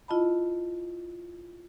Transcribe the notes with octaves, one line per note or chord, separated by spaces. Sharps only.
E4 F4 D#5 A5 B5